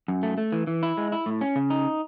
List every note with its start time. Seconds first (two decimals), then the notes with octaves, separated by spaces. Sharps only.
0.08 F#2
0.23 A3
0.38 A3
0.52 E3
0.67 E3
0.83 E4
0.98 G#3
1.12 E4
1.26 A2
1.41 C#4
1.56 C#3
1.70 D#4